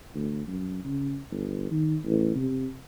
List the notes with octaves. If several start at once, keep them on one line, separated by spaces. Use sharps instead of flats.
D2
F#2
C#3
G1
D#3
A1
C3